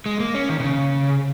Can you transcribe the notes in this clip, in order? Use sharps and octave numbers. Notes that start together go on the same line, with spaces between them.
G#3
A#3
C#4
D#3
C3
C#3